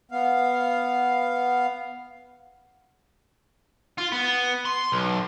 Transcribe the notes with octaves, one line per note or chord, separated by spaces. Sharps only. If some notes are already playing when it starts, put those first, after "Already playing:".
B3 F5
F4
B3
C6
B1